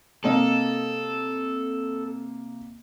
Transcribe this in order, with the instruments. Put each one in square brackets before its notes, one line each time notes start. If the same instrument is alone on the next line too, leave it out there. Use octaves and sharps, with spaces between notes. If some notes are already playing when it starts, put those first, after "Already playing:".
[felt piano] C3 A#3 D#5 [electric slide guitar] A4